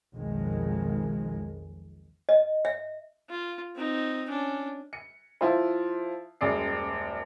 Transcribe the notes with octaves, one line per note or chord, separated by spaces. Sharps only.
B1 F2 D#3 G#3
D#5
E5
F4
C4 D#4
C#4 D4
C#7
F3 E4 F4 C5
D#1 F#2 G#3 D5 C7